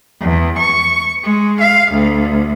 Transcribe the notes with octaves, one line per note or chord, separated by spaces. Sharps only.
E2
C#6
G#3
F5
D2